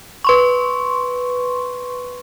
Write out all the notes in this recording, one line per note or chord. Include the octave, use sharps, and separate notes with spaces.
B4 C6 C#6